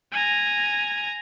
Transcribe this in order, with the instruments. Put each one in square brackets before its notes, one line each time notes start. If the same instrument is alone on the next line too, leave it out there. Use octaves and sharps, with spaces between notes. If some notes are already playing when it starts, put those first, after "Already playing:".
[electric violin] G#5 A#5